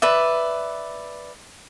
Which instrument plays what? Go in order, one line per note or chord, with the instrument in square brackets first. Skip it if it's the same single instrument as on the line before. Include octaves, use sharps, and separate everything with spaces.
[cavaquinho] B4 D5 E5